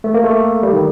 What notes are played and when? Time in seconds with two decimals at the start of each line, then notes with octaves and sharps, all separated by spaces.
0.04 A3
0.14 A#3
0.24 A3
0.63 G3
0.73 D#3